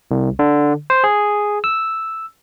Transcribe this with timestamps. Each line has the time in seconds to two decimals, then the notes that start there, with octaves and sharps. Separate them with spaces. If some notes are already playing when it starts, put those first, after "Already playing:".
0.11 C2
0.39 D3
0.90 C5
1.04 G#4
1.64 E6